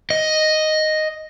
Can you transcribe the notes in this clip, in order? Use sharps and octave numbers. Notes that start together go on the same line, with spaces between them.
D#5